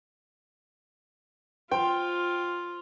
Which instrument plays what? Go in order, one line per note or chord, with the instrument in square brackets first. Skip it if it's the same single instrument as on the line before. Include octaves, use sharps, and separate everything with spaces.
[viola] F4 [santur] C5 [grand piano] G5